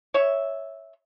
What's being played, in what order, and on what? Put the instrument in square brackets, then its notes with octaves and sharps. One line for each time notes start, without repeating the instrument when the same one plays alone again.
[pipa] C#5 E5